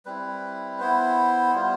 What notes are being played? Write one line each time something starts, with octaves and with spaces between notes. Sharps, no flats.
G3 C4 E4 B4
B3 E4 C5
G3 B3 F4